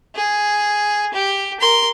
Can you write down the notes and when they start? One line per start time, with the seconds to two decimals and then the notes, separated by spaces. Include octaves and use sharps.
0.15 G#4
1.14 G4
1.60 A#4 C6